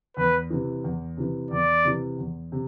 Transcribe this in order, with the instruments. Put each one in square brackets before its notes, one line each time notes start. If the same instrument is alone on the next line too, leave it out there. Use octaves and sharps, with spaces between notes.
[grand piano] E2 [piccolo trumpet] B4
[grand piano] C3 E3
E2
C3 E3
[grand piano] E2 [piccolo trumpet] D5
[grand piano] C3 E3
E2
C3